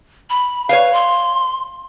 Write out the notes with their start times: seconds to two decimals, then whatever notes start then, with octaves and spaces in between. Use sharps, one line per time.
0.30 B5
0.69 B4 C#5 F5
0.94 C6